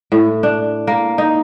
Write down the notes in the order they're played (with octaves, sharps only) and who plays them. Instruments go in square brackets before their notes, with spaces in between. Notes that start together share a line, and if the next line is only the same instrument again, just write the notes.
[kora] A2
D4
A#3
D#4